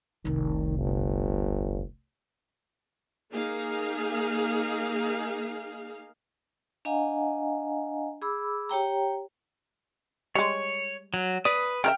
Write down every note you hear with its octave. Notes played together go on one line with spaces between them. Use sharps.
F1 C2 D#3
G1
A#3 D#4 G#4 F5
D4 D#5 F5 F#5 G#5 A#5
G#4 B5 D6 E6
G4 C#5 G5 A#5
G3 G#3 C#5
F#3
B4 D5 D#6
C#3 A#4 E5 G5 F6